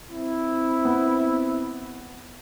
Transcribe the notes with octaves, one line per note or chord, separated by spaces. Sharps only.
C4 E4
B3